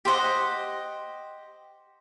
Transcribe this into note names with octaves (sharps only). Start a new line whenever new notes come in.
G4 C5 D#5 F#5